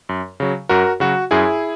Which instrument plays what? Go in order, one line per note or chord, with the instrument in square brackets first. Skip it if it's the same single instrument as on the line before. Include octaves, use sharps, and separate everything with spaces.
[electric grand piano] F#2
C#3 F#3
F#2 F#4 A#4
C#3 F#3 F#4
F#2 E4 G#4